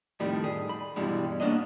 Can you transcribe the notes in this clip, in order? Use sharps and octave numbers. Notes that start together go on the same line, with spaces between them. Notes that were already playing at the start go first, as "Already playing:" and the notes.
F2 A2 D#3 G3
G#4
B5
G2 B2 E3 G3 G#3
A#3 B3 C#4 D4 D#5